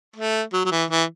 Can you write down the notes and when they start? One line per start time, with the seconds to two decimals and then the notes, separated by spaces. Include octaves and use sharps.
0.16 A3
0.53 F#3
0.65 F#3
0.71 E3
0.90 E3